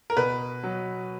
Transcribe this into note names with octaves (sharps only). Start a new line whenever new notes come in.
A#4
B2 B4
F#3